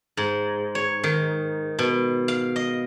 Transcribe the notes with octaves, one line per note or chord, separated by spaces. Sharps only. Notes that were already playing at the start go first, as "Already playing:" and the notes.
G#2
C#5
D#3
B2
F5
D#5